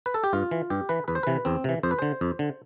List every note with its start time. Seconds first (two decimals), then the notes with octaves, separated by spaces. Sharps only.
0.06 B4
0.14 A4
0.24 G4
0.33 G2 F4
0.51 E3
0.70 G2 G4
0.89 E3 B4
1.08 E2 B4
1.15 C5
1.23 C3 E3 B4
1.45 E2 C4
1.64 C3 E3
1.83 F2 C5
1.91 B4
1.99 D3 C5
2.21 F2
2.39 D3